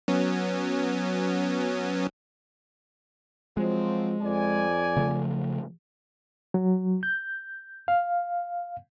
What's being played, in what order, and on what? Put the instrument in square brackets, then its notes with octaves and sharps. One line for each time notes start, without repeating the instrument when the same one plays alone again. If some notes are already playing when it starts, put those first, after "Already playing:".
[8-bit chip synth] F#3 B3 C#4
[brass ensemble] F3 F#3 C4 [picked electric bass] G#3
[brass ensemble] F2 D5 G#5
[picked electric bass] C#3 F3 A3
[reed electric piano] F#3
G6
F5